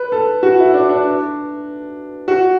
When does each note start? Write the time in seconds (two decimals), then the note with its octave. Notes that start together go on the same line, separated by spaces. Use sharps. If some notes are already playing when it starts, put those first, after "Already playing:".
Already playing: B4
0.12 A4
0.43 F#4
0.59 E4
0.74 D4
0.89 D4
2.28 F#4